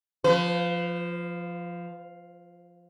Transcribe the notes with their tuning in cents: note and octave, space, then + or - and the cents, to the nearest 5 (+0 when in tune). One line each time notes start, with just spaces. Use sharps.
F3 +0 B4 +45